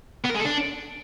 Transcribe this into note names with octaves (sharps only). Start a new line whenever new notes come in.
B3
A#4
G#3
A4
D4